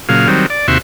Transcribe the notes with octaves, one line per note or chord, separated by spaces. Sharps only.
A#2 C#3 F#3 F5
D#3 F#3 G3 C4
D5
D#2 C3 F#4 E5 C6 C#6